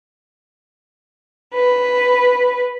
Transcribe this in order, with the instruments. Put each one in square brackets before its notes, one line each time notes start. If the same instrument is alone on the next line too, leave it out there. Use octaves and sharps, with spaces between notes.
[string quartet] B4